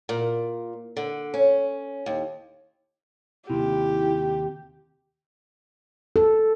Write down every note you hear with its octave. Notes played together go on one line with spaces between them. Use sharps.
A#2
D3
C#4
D#2
D#2 C3 E4 G4
A4